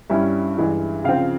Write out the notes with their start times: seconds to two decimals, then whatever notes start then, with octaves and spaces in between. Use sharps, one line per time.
0.10 G2 G3 C#4 E4 E5
0.58 G2 E3 G#3 E4
1.04 C#3 F3 C4 F5